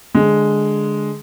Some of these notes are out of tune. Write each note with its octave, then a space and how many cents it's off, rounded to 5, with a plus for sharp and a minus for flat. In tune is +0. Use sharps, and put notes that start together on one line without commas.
D3 +0 G#3 +0